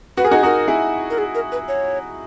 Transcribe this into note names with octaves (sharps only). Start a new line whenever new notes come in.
F#4 B4
G#4 A#4
D#4 F#4
G#4
D#4 F#4 A#4
E4 G#4
A#4
G#4
A#4
B4
C#5